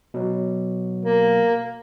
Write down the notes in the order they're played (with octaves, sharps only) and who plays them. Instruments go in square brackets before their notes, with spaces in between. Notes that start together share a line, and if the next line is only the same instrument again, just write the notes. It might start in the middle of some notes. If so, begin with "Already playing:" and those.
[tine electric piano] B2 F#3
[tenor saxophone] A#3